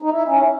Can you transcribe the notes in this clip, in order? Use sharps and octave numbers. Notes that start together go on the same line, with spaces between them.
D#4
E4
C#4